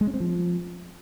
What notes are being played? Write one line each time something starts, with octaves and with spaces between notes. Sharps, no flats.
G#3
C#4
C4
F3